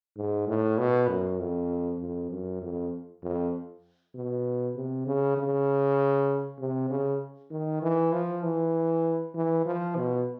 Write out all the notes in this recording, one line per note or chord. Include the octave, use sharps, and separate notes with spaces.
G#2
A2
B2
F#2
F2
F2
F#2
F2
F2
B2
C3
C#3
C#3
C3
C#3
D#3
E3
F3
E3
E3
F3
B2